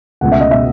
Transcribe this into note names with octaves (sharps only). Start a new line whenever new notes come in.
C#2 B2 A3 F#5
E5
D#5
B2 A3 E5